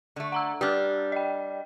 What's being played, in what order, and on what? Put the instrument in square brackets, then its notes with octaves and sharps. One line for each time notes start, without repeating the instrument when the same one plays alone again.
[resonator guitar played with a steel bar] D3 A3
[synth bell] F#5 A#5 E6
[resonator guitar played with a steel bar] G3 D4 [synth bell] G4 F6
[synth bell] D#5 G5